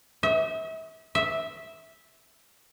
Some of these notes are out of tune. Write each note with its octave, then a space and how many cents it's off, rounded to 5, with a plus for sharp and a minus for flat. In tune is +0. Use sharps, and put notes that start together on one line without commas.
E5 -35
E5 -10